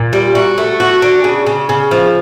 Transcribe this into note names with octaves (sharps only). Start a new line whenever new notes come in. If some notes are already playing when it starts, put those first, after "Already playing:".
Already playing: A#2
G3
F#4
A3
F#4
D4
C#3
C#3
C#3
F3